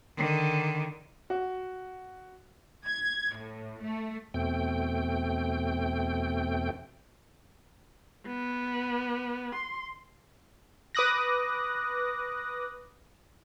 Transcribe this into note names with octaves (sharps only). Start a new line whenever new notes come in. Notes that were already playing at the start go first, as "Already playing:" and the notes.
D3 D#3
F#4
G#6
A2
A3
E2 B2 A3 C4 G5
B3
C6
B4 D6 D#6 F#6 A#6